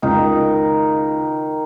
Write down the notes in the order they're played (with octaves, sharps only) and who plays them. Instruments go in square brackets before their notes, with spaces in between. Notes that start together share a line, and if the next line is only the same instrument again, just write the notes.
[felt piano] C#2 [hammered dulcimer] D#3 D#4 A#4